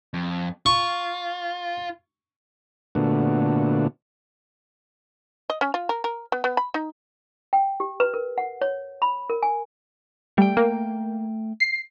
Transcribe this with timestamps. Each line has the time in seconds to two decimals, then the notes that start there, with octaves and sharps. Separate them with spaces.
0.14 F2
0.66 F4 C#6
2.95 A#2 D3 A3 B3 D4 F#4
5.50 D#5
5.61 C#4
5.74 F4
5.89 A#4
6.04 A#4
6.32 B3
6.44 B3
6.57 B5
6.74 D#4
7.53 G5
7.80 G4
8.00 B4
8.14 A#4
8.38 F#5
8.61 C#5
9.02 B5
9.30 A#4
9.43 G#5
10.38 G3 A3 G5
10.57 A#3
11.60 C7